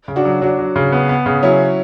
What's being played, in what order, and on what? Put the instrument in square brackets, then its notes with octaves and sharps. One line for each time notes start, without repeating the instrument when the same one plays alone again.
[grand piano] C#3
[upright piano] D4 F#4
[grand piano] F#3
[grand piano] F#3 [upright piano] D4 F#4
[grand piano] F#3
C#3
B3
B3
C#3
[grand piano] F#3 [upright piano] C#4 E4